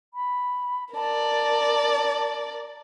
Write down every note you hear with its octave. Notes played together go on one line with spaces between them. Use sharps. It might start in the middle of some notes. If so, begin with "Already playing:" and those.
B5
A#4 D5 A5